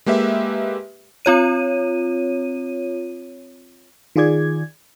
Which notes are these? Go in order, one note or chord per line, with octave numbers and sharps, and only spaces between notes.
G#3 A#3 G4 B4 E5
C4 F4 C#5 D#7
D#3 F4 G#4 D5 G#6